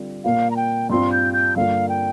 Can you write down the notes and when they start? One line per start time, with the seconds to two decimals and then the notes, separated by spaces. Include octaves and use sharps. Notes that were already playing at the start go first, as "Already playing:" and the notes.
Already playing: D3 G3 C4 F4
0.24 A#2 A#3 F4 F5
0.51 A#5
0.56 G5
0.90 G2 G3 C4 F4 C6
1.12 G6
1.33 G6
1.56 G2 D3 A#3 F4 F5
1.89 G5